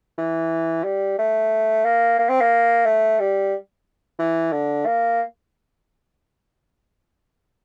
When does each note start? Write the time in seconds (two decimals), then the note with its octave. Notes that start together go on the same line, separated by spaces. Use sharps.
0.18 E3
0.84 G3
1.19 A3
1.85 A#3
2.19 A#3
2.29 C4
2.41 A#3
2.86 A3
3.19 G3
4.19 E3
4.53 D3
4.86 A#3